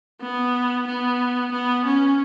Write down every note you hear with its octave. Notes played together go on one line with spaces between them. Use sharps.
B3
B3
B3
C#4